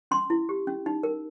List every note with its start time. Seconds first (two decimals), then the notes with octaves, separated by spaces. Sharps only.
0.11 C#4 C6
0.30 E4
0.49 G4
0.67 C#4
0.86 D#4
1.03 A#4